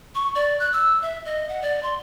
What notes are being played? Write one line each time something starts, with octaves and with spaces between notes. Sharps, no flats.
C#6
D5
F#6
E6
E5
D#5
F#5
D5
C6